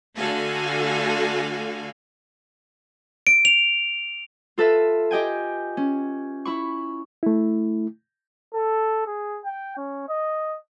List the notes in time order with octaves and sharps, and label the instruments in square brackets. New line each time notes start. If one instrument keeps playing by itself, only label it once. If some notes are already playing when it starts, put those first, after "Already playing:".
[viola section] D3 A3 F#4 A4 F5 G#5
[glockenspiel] D7
F7
[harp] F4 A4 B4 E5
G4 D#5 G5 G#5
C#4
E4 B5 C#6
[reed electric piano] A3 E4
[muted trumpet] A4
G#4
G5
C#4
D#5